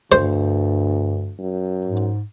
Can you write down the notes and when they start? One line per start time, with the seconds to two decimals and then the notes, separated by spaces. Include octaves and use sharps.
0.12 D2 G2 C5
1.39 F#2
1.85 G#2